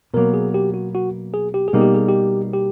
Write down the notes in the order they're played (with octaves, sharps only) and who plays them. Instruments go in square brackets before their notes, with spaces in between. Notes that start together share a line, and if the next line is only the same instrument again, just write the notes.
[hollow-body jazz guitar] B2 F#3 A#3 [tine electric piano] A#4
[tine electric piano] G#4
G4
F#4
F#4
G#4
G4
G#4
[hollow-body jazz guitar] B2 G3 A#3 D#4
[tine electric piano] G4
G#4
G4
G4